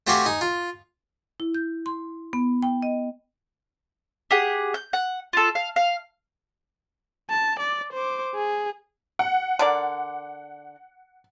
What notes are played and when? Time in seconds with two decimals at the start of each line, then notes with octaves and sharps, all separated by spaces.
0.07 A3 C4 F#4 G4 F5 G#5
0.26 D#4 G#5
0.41 F4
1.40 E4
1.55 G6
1.86 C6
2.33 B3
2.63 G5
2.82 D#5
4.31 G4 G#4 F#5
4.74 G6
4.93 F#5
5.33 F4 A4
5.55 F5
5.76 F5
7.30 A5
7.60 D5
7.93 C5 D6
8.35 G#4
9.19 F#5
9.59 D3 A#4 D5